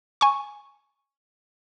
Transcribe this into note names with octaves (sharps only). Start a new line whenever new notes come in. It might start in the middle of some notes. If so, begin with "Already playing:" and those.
G#5 C#6